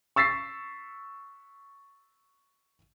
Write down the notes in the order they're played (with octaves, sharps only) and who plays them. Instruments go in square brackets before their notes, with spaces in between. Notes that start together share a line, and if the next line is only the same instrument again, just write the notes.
[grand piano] C#6 E6 A6 B6 C7